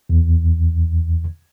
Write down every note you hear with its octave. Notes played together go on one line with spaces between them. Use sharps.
E2